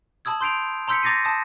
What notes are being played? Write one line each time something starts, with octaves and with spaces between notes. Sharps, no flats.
A5 B5 D#6 E6 G#6
C6 G6 C7 D7 F7
A#5 C6 E6 G6 B6 C#7
A#5 D6 A6 A#6 C7 D#7
A5 D#6